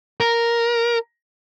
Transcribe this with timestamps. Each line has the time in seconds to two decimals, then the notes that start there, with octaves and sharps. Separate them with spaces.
0.20 A#4